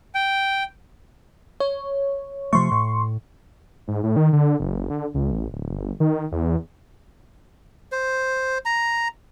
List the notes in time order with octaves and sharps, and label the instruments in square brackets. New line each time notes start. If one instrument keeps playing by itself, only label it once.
[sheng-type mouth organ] G5
[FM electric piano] C#5
[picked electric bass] C3 F3 A3 [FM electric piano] C6 C#6
[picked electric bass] A2
[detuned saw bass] G#2
A2
D#3
D3
F#1
D3
C#2
A1
D1
G1
D#3
E2
[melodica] C5
A#5